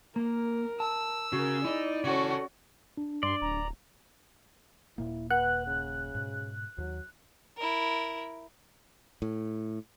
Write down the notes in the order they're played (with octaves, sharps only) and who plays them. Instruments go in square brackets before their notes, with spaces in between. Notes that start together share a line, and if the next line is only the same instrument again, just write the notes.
[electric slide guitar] A#3 [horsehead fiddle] A#4
[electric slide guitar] A5 [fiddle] E6
[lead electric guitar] C#3 [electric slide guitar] F#4 [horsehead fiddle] G#4 A#4
[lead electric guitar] D#4 [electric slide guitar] E4 [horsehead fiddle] D5
[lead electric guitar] C#3 A4 [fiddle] C#4 F#4
[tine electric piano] D4
[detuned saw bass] G2 [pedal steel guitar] D5 [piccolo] C6
[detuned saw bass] D1 [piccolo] A#5
[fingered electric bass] D#1 A#2 A#3 [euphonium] E4
[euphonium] B4 [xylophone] F#5 [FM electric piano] F#6
[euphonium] C#3
[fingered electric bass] G#2 B2
[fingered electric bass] D#2 [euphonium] F#3
[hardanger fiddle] E4 A#4
[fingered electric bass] A2